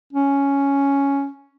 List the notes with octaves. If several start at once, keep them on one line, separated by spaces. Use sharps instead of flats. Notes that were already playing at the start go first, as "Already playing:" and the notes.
C#4